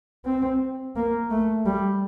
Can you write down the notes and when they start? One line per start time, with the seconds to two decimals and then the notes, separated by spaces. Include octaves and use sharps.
0.25 C4
0.96 A#3
1.30 A3
1.66 G3